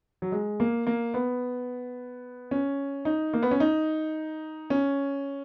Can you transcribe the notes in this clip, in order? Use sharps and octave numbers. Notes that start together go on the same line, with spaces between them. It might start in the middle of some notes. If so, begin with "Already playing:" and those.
F#3
G#3
A#3
A#3
B3
C#4
D#4
A#3
B3
C#4
D#4
C#4